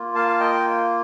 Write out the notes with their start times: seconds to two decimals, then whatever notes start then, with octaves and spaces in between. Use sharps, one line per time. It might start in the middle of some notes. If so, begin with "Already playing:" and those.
Already playing: A#3 F4
0.15 F5 A5
0.28 F5
0.40 D#5 G5